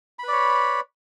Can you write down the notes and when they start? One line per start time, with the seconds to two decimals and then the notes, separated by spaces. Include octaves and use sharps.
0.19 B5
0.23 B4
0.28 D5
0.33 C#5